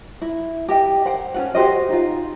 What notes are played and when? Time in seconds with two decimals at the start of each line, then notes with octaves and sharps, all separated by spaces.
0.21 E4
0.68 G4 D#5 G5
1.05 C5 F#5 G5
1.34 C#4 F4 F#5
1.55 F#4 G4 C5 D#5
1.89 D#4 F4